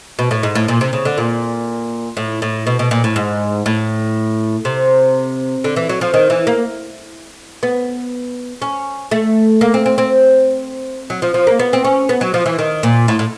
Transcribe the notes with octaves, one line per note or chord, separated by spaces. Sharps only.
B2
A2
G#2
A2
A#2
C3
C#3
D3
A#2
A2
A2
B2
B2
A#2
A2
G#2
A2
C3
D3
E3
F#3
F3
D#3
E3
A#3
B3
C#4
A3
A#3
C4
C4
C4
F#3
F3
F3
A#3
B3
C4
C#4
B3
F#3
F3
E3
D#3
A#2
A2
A2